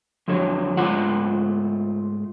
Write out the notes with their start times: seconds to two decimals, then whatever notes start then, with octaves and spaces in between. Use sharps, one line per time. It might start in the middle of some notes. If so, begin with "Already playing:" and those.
0.28 F2 D3 F#3 C#5
0.77 G#2 A3 F4 C5 F#5